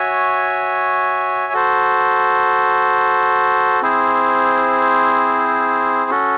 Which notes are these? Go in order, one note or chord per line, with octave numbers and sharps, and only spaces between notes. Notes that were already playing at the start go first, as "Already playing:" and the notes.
Already playing: F#4 C#5 E5 G#5
F#4 A4 C5
C4 E4 G#4 C5
C#4 F#4 A4